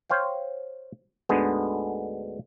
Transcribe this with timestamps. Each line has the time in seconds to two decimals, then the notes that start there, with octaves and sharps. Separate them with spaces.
0.10 C5 C#5 F5 G5
1.29 D2 G#2 D3 G#3 B3